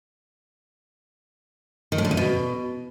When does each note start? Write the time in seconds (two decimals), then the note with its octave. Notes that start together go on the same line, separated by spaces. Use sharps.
1.92 D#3
1.98 A2
2.05 D3
2.11 E2
2.17 B2